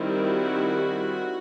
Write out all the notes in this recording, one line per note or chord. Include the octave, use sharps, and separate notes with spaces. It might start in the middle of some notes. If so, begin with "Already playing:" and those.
Already playing: D#3 G3 C4 E4
F#4